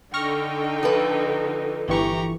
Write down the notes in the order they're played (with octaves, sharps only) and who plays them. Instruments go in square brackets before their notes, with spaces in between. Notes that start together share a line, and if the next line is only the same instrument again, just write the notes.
[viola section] D3 D#4 [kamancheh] G5 [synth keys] C#6 F6 A#6
[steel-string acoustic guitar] F3 A4 B4
[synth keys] G1 E3 C#6 [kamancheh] G4 A#5